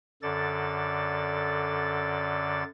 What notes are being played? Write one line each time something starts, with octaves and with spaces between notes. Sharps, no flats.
F#2 D3 A4 D5 A6